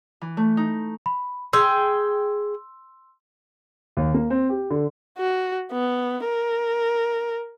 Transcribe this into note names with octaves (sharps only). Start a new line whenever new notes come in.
E3
A3
D#4
B5
G#4 G5 C6 E6
D#2
A#3
C4
G4
D3
F#4
B3
A#4